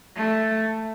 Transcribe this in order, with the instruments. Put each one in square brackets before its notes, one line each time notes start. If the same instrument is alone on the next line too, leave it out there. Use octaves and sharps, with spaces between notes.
[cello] A3